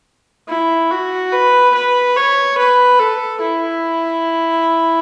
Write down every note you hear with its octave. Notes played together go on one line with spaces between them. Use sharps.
E4
F#4
B4
B4
C#5
B4
A4
E4